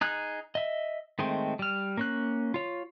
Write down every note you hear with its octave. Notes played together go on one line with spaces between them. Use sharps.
D#4 G#4 F#6
D#5 E5
D#3 G#3 A3 C4
G3 F6
A#3 C#4 F#6
F4 C#5